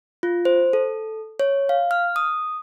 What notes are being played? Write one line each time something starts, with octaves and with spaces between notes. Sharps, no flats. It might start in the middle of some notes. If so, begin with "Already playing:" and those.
F4
C5
A4
C#5
F5
F6
D#6